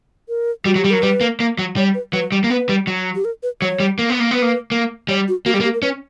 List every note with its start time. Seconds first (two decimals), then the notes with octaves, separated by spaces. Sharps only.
0.29 A#4
0.65 G3 F#4
0.75 F#3
0.78 G4
0.85 G3
0.91 F#3 A#4
1.03 G3 B4
1.21 A#3
1.40 A#3
1.59 F#3
1.77 G3 C#5
1.94 B4
2.13 F#3 B4
2.32 G3
2.44 A#3
2.50 B3 B4
2.69 G3
2.87 F#3
3.15 G4
3.25 A#4
3.43 B4
3.62 F#3 C#5
3.80 G3
3.99 A#3
4.10 B3
4.20 A#3
4.31 B3 B4
4.42 A#3
4.72 A#3
5.08 G3 C#5
5.28 F#4
5.46 A#3 F#4
5.54 G3 G4
5.60 A#3
5.64 G4
5.74 A#4
5.82 C#4 B4